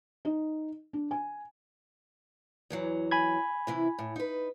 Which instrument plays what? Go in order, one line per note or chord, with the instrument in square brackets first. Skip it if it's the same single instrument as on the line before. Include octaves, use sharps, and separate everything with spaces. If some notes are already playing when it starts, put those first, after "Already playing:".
[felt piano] D#4
D4
G#5
[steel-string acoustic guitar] E2 E3 F#3
[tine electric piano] G#5 B5 G#6
[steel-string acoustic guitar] C3 E3 E4
A2
D#4 B4